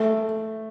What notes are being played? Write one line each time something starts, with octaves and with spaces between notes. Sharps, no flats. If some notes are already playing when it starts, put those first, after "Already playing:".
Already playing: A3